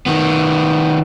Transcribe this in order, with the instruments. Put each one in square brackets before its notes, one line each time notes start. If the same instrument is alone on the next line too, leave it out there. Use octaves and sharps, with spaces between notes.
[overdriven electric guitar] D#3 B3